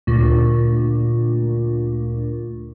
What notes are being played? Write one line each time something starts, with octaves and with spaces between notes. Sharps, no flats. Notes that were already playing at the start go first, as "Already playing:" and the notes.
D2 A#2